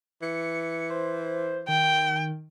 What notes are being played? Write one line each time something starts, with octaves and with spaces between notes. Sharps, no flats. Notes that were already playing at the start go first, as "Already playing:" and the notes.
E3 C#7
C5
D#3 G5